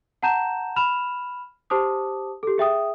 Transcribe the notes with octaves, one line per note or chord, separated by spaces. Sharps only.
F#5 A5 A#5 G6 E7
B5 F6 E7 F7
G4 C5 A5 D6 D#6
G4 A4
G#4 E5 G5 D#6